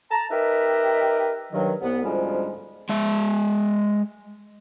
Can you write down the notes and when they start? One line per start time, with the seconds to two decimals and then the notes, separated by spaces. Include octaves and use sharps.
0.11 A5 A#5
0.31 D#4 G4 A#4 B4 D#5 E5
1.52 G2 D#3 F#3
1.81 C2 B3
2.04 D2 G#2 F3 G3 G#3 C#4
2.89 G#3 E5